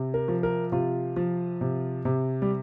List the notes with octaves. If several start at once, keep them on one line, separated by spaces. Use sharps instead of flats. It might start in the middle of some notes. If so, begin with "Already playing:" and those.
Already playing: C3
A#4
F3
A#4
C3 F4
F3
C3
C3
G3